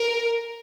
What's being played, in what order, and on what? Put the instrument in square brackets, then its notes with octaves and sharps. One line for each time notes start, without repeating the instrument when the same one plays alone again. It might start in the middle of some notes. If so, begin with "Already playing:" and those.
Already playing: [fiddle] A#4